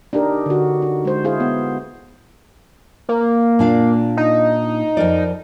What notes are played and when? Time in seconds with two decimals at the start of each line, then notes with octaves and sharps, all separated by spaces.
0.13 D4 D#4 G4 A#4
0.46 D3 F#4
0.82 D#4
1.05 G#3 C5
1.24 E4 G#4 C5 F5
1.40 B3
3.09 A#3
3.59 A#2 D4 F5
4.17 D#4
4.97 F2 A#4 D5